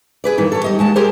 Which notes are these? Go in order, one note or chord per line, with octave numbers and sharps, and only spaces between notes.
G#4 B4 D5
G2 D#3 E3
A4 C#5
G3 D#5
D#2 G#3 A5
G4 G#4 A#4 C5